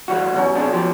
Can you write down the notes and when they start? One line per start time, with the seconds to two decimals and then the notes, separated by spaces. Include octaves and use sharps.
0.08 E3 G3 F#4
0.34 B2 F#3 C#4
0.55 C3 D4 G#4
0.73 F3 G4